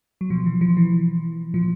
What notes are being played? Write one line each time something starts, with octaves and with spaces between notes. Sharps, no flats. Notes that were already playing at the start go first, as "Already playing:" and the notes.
F#3
B2 F3
E3
F3
E3
A#2 F3